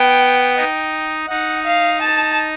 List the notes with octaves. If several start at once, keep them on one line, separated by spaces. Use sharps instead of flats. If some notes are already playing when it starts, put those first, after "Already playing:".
Already playing: B3 G5
D#4
D#4 F#5
F5
A5